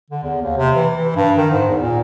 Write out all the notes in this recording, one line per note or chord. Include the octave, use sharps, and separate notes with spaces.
D3
E2
D#2
C3
E3
E3
G2
D#3
G#2
E2
A#2